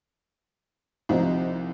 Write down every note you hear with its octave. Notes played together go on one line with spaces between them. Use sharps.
C2 C3 F3 D#4